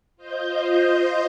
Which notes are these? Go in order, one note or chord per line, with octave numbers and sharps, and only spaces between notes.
F4 C5 D#5 G6